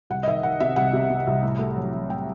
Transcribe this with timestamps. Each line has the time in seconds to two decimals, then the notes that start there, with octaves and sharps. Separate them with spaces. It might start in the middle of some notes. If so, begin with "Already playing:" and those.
0.10 C2 F#5
0.23 D#5
0.27 D#3 E5
0.43 D#3 F#5
0.60 C3 E5
0.76 C2 F#5
0.93 C3
1.10 C3
1.27 C2
1.43 A2
1.59 A3
1.76 F#3
1.93 F#3
2.09 A2 G5